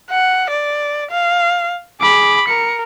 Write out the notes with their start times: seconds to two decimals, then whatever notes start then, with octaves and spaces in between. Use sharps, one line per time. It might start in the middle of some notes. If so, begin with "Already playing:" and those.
0.10 F#5
0.50 D5
1.11 F5
2.01 G#4 B5 D6
2.48 A#4 C#7